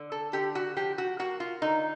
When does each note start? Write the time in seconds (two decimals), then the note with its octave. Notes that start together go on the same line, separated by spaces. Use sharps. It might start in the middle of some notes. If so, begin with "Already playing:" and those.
Already playing: D3
0.12 A4
0.33 D3 G4
0.55 F#4
0.76 F3 G4
0.98 F#4
1.19 A#3 F#4
1.40 F4
1.62 D3 D#4